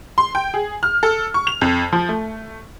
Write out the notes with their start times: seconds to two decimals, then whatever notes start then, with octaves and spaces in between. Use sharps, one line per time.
0.18 C6
0.35 G5
0.54 G#4
0.83 F6
1.03 A4
1.34 C#6
1.47 F7
1.61 F2
1.93 F3
2.09 A3